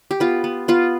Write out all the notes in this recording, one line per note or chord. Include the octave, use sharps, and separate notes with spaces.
G4
B3 F4
B3
B3 F4